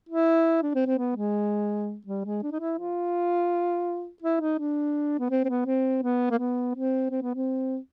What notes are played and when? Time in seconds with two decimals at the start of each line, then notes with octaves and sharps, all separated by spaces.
0.09 E4
0.63 D4
0.74 C4
0.86 C4
0.98 B3
1.16 G#3
2.07 G3
2.25 G#3
2.43 D4
2.52 D#4
2.60 E4
2.79 F4
4.22 E4
4.40 D#4
4.59 D4
5.19 B3
5.30 C4
5.44 C4
5.49 B3
5.66 C4
6.03 B3
6.31 A#3
6.38 B3
6.75 C4
7.10 C4
7.22 B3
7.35 C4